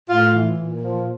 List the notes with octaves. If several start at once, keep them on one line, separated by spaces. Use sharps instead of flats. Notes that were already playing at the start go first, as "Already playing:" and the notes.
A2 F4
E3
A#2
F3